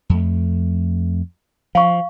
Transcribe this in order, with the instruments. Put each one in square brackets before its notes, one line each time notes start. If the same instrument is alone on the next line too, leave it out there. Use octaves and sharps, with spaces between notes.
[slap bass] F2 A3
[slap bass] F3 [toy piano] F5 C#6